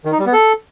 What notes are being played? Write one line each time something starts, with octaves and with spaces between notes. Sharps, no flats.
D#3
D#4
G3
B3
A4